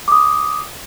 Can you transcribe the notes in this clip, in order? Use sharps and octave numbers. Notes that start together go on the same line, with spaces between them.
D6 D#6